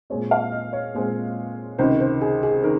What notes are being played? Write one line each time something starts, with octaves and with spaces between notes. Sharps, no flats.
A#2 G#3 C4 C#5
F5
D#5
C#5
A#2 G#3 C4
C#2 C3 D#3 C5
C5
G#4
G#4
D#3 A#4